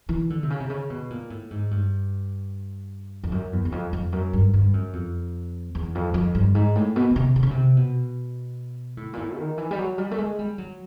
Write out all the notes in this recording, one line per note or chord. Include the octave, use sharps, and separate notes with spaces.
E3
D3
C3
C#3
C3
C#3
B2
A#2
A2
G#2
G2
F2
F#2
E2
E2
F2
F2
F#2
G2
G2
F#2
F2
E2
F2
F2
G2
G#2
A2
B2
B2
C3
C3
C#3
C3
B2
A2
A#2
A2
D#3
E3
G3
F#3
G3
A3
G#3
G3
F#3